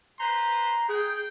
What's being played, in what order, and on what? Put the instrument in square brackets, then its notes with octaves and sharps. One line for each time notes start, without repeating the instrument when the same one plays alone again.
[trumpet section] B4 C5 C6 [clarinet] A#5
[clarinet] G#4 [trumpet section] G5